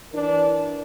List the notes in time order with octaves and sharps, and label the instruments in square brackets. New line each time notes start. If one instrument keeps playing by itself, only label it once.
[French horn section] E3 D4 A#4